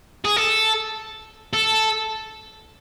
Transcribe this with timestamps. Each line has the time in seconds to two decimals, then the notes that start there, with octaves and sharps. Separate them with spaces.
0.25 G#4
0.36 A4
1.53 A4